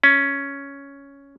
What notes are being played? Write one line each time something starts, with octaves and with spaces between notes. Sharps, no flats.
C#4